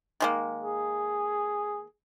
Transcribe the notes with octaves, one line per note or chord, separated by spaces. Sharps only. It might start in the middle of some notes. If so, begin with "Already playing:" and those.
D#3 G#3 A#3
G#4